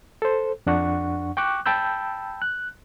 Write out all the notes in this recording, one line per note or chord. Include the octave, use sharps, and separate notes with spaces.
A4 C5
F2 D4 F#5 C#6
G5 C#6 D6 F#6
G5 A5 B5 E6 G6
F#6